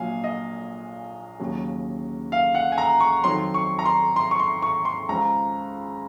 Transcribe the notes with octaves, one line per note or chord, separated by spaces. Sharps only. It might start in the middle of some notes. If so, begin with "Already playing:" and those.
Already playing: A#1 A#2 F#3 F5 G#5
D#5
D#2 C#3 F#3
F5
F#5
G#5
A#5
C#6
F2 D#3 F#3 C6
C#6
A#5
C6
C6
C#6
C6
C#6
C6
C#2 C#3 F3 A#5